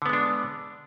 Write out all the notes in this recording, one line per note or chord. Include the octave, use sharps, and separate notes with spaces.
D3 G#3 B3 D4